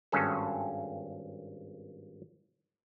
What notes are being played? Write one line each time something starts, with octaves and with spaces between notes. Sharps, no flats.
G#1 G2 C#4 G#4 A4